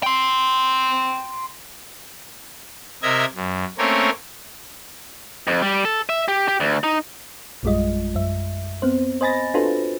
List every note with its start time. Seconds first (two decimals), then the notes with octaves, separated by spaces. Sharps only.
0.03 G5 C6
3.03 C3 A#4 D#5 E5 G#6
3.35 F#2
3.78 A3 A#3 C4 C#4 A#4 C#5
5.47 F2
5.62 G3
5.85 A4
6.09 E5
6.28 G4
6.48 G4
6.60 D2
6.84 D#4
7.63 A#1 F#2 G3 G#3 F4 D#5
8.15 F#2 E5
8.82 B3 C4 C5
9.21 C5 D#5 G#5 B5 A6 A#6
9.54 D4 F4 F#4 A4 B4 C5